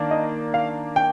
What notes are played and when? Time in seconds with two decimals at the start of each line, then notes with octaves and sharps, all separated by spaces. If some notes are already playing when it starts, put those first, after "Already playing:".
Already playing: D#3 A#3 D4
0.11 D#5
0.54 F5
0.96 G5